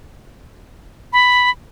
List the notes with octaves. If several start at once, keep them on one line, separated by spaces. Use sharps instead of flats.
B5